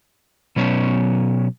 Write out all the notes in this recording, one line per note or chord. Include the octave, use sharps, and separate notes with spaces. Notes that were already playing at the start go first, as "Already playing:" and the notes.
B2 F#3 B3 C#4